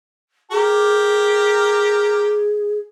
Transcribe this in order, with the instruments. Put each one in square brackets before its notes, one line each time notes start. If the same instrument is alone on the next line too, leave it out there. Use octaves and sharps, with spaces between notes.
[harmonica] G4 A#4 [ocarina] G#4